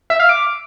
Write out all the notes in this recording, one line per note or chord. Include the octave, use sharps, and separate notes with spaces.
E5
F5
D6